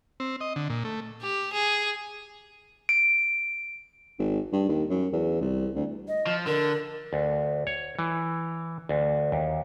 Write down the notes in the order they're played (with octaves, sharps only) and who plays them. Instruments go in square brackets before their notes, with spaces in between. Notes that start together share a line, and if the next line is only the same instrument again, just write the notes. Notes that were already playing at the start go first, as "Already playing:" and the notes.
[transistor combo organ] C4
D#5
D3
A#2
A3
[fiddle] G4
G#4
[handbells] D7
[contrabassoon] G#1
G2
D#2
F#2
E2
C2
D2
[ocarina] D#5
[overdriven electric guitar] F3
[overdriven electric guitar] D3 [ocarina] A#4
[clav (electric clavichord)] D2
C#5
E3
D2
D#2